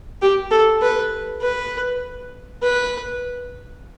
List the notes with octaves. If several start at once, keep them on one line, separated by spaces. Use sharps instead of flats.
G4
A4
B4
B4
B4